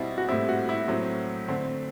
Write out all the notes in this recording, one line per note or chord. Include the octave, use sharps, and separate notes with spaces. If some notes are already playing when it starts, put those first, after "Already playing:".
Already playing: B2 G3 C4 E4
F#4
A2 G3 C4 E4
F#4
E4
A2 F#3 C4
D3 A3 C4